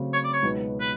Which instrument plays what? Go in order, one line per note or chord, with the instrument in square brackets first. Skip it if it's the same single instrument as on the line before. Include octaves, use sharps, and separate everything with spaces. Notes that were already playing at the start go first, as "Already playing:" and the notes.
Already playing: [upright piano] C#3 F#3 A3 C4
[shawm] C#5
D5
C#5
[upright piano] C#2 B2 F#3 B3 D#4
[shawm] B4